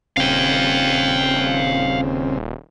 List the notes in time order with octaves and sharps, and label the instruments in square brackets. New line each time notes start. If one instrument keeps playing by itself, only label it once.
[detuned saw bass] D#1 [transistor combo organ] C#3 C4 [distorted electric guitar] F5 G5